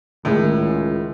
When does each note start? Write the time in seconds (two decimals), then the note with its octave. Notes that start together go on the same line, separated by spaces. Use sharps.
0.25 C#2 A2 D#3 G#3